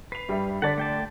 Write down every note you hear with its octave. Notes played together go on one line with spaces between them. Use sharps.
B4 C7 F7
G2 G3 E5
D3 D5 F#5 A5 B6
A3 G5 A5